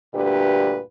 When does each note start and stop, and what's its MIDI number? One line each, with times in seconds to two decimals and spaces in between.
0.14 0.79 38
0.14 0.79 43
0.14 0.79 46
0.14 0.79 50
0.14 0.79 67
0.14 0.79 71